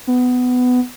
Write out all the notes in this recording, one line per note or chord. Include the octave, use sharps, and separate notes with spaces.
B3